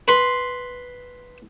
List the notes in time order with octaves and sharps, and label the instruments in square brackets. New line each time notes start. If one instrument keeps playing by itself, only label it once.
[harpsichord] B4 C6